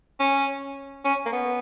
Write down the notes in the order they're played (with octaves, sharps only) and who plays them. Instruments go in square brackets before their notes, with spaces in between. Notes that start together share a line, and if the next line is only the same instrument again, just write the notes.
[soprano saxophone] C#4
C#4
A#3
B3